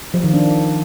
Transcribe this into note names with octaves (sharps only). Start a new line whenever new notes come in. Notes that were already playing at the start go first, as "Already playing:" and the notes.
F3
D#3
D4